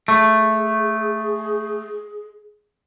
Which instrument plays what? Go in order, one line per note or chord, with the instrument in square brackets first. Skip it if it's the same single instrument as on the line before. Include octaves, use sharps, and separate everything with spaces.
[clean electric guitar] A3 [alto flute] G#4